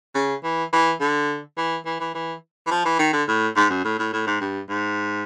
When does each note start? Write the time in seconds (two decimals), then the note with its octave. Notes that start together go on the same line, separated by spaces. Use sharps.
0.15 C#3
0.44 E3
0.73 E3
1.01 D3
1.57 E3
1.86 E3
2.00 E3
2.14 E3
2.67 E3
2.71 F3
2.85 E3
2.99 D#3
3.13 D3
3.28 A2
3.56 G#2
3.70 F#2
3.84 A2
3.99 A2
4.13 A2
4.27 G#2
4.41 G2
4.69 G#2